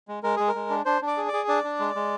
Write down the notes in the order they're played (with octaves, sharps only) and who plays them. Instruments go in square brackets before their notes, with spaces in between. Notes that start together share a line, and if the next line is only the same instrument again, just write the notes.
[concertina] G#3
G#3 A#4
G#3 G#4
A#4
G#3
D4
D4 C5
D4
D5
G#4
D5
G#4
D4 D5
D4
G#3
G#3